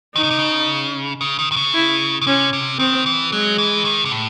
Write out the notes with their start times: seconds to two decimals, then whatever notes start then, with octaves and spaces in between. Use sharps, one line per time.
0.15 D#3 D#4
0.23 C#3
0.30 C3
0.39 C#3
1.21 C#3
1.39 D#3
1.52 D#3
1.56 C#3
1.74 E4
2.21 C#3
2.27 C3 C#4
2.53 C3
2.79 D#3 C4
3.06 E3
3.32 F#3 G#3
3.58 E3
3.85 D#3
4.05 C3
4.11 A2